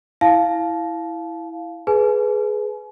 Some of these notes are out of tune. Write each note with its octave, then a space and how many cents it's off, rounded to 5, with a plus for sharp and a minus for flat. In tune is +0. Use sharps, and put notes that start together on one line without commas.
E4 +0 F5 +0 A5 -25
G#4 +20 B4 +0 G#5 +45